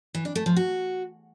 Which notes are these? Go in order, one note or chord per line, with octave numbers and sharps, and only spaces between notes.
E3
D4
A3
F3
F#4